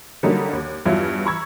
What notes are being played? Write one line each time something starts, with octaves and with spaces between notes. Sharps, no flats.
D3 F#3 G3 A#3 C#4 D#4
D#2
E2 G2 F#3 E4 F4 G#6
A#5 B5 C#6 E6 G#6